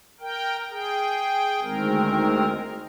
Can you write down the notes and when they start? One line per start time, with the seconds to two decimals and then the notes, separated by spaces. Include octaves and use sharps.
0.20 A#4 G5
0.70 G#4 G5
1.62 D2 D#3 G#3 C4 A#4